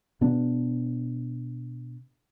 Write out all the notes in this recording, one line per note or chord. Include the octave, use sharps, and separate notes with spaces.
B2 B3 D4